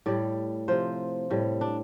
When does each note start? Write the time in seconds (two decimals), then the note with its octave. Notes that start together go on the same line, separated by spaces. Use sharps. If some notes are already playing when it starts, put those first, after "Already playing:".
0.06 A2 G3 D5
0.68 C3 F3 C5
1.30 A2 G3
1.61 D4